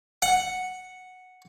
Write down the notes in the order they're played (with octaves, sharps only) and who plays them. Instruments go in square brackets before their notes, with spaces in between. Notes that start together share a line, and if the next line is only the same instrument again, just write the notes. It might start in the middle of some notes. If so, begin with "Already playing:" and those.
[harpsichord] F#5